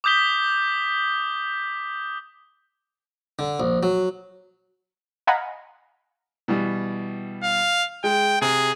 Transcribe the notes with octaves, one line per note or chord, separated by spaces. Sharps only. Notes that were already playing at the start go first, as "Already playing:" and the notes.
D6 D#6 G6 B6 G7
D3
A#1
F#3
D#5 F5 F#5 G#5 A#5 B5
B2 E3 G3
F5
G#3 G5
C3 G#4